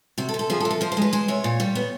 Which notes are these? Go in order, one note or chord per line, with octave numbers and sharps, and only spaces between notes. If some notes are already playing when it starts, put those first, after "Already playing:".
C3 F#4
A4
C3
A4
F3 G#4
A4
C3
A4
F3 C5
C5
G#3 B4
G#3 C5
C3 C#5
A#2
G3
B3